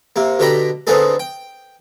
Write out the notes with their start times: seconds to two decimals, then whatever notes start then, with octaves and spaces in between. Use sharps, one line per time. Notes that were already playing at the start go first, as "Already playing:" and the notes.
0.16 C3 A#3
0.39 B2 D3 G4 G5 A#5 B5
0.87 D3 B3 C4 D#4 G#4 A4
1.20 G5